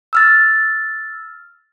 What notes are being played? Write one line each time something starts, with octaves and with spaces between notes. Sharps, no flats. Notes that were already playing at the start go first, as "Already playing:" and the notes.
E6 F6 A6